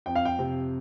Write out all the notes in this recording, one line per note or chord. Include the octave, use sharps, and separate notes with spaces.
F2 G5
F5
G5
C3